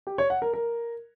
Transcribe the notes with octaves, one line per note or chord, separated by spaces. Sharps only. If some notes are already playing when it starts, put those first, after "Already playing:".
G4
C#5
F#5
A#4
A#4